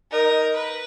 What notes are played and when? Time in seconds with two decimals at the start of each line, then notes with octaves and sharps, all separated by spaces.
0.12 D#4 A#4
0.56 B4